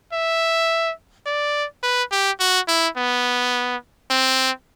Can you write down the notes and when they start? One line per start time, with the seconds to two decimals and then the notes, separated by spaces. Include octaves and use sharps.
0.13 E5
1.26 D5
1.83 B4
2.12 G4
2.40 F#4
2.68 E4
2.97 B3
4.11 C4